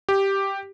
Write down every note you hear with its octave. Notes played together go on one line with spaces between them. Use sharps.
G4